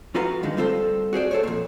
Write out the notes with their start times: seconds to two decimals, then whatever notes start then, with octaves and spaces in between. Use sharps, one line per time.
0.15 F2 F4 F#4 B4 F5 A#5
0.43 G2 D3 D#3 G#3
0.57 G3 C4 F4 A4 B4 C5
1.13 F#4 G#4 C5 D5
1.31 A4 C5 C#5
1.43 F2 A#2